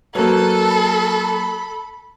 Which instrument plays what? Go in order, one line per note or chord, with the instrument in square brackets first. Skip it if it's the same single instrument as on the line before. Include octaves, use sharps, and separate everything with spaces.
[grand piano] F#3 A#3 [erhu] A4 [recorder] B4
[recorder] B5